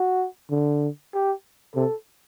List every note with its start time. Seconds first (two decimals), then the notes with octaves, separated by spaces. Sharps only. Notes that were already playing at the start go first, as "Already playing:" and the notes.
Already playing: F#4
0.51 D3
1.14 G4
1.76 C3 A4